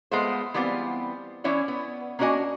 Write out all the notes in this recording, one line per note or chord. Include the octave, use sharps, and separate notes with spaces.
G#3 A3 B3 F4 C5
E3 G3 B3 C4 F4
E3 C#4 E4 C#5 D5
B3
A#3 C#4 D4 F#4 D#5 G#5